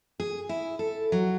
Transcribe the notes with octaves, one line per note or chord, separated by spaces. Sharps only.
G#4
E4
A4
F#3